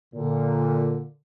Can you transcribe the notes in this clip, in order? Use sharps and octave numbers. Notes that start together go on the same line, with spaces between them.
A#2 D3